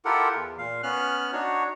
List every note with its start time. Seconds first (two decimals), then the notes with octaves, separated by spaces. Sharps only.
0.05 E4 F4 G4 A4 A#4 F#5
0.34 E2
0.58 A#2 F5
0.83 B3 C#4 F6 F#6
1.32 D4 D#4 F#4 C#5